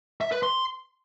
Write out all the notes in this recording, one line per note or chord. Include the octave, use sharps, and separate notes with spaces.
E5
B4
C6